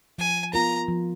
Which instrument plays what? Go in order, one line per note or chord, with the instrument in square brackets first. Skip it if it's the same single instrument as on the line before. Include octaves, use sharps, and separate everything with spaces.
[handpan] F3 [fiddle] G#5
[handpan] B3 F4 A#4 [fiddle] A#5
[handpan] F3